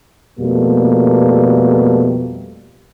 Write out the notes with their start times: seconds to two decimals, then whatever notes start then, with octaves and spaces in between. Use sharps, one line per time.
0.39 F2 B2 G3 A3 A#3